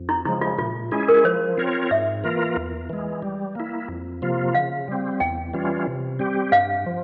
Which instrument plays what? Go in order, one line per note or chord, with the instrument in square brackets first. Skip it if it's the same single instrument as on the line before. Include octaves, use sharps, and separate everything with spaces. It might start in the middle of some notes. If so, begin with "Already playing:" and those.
Already playing: [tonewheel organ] F2
[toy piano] E4
[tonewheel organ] C#3 F3 G#3 [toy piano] E4
[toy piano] F4
[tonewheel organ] A#2 [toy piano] F4
[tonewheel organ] G#3 C#4 E4 G#4 [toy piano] F4
[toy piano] A#4
[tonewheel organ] F3 [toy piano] C5
[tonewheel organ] C4 F4 A#4 C#5
[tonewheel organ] G#2 [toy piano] E5
[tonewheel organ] E3 A#3 F4 A#4
E2
E3 G#3
G3
A#3 E4
F2
C3 F3 A#3 F4
[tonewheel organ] C#3 [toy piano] F5
[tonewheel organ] G3 C4
[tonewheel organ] E2 [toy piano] G5
[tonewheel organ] E3 G3 C#4 F4
C3
G3 C4 G4
[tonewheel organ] G2 [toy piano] F5
[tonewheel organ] F3